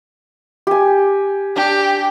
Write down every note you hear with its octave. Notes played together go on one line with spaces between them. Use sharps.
G4 G#5
D4 G4